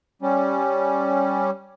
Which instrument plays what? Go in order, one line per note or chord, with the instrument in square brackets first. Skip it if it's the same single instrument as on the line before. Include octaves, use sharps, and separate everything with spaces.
[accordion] G3 C#4